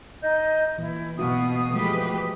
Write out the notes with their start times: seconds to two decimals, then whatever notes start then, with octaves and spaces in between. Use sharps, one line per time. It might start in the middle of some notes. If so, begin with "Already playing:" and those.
0.23 D#4 D#5 G6
0.78 A#2 E3 E4
1.19 B2 F#4 F5 D#6
1.72 F3 G#3 A3 G4 B4